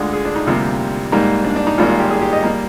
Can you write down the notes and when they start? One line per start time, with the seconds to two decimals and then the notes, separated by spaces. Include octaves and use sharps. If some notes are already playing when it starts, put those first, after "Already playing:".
Already playing: D2 D3 G#3 F4
0.13 G#4
0.25 D4
0.36 D#4
0.46 D2 C3 G3 A#3 F4
1.12 G#2 G3 A#3 D#4
1.45 D4
1.56 D4
1.67 D#4
1.78 G#1 G#2 G3 A#3 F4
1.89 F4
2.00 G4
2.11 G#4
2.22 G4
2.33 D#5
2.44 G3 A#3